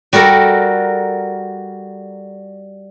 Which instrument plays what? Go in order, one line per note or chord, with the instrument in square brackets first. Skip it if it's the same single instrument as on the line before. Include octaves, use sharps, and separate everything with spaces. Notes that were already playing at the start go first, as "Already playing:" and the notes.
[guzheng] G3 F#4 A4 A#4